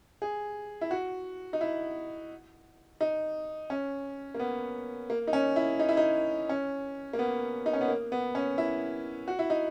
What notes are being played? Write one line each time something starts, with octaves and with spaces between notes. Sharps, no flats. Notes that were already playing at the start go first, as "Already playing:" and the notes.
G#4
E4
F#4
D#4
E4
D#4
C#4
A#3
B3
A#3
D#4
C#4
E4
D#4
E4
D#4
C#4
A#3
B3
D#4
C#4
B3
A#3
B3
C#4
E4
F#4
E4
D#4